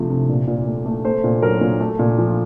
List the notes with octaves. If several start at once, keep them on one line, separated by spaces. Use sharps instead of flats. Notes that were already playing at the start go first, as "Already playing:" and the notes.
Already playing: C3 F3 A3
C3
A#2
A#2
A3
A3
A3 C5
A#2
F#3 A#4
A#2
A3
A#2
F3